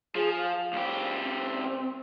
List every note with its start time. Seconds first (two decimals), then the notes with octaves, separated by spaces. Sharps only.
0.15 F3 G#4
0.38 F5
0.73 C#2 G4
1.24 C4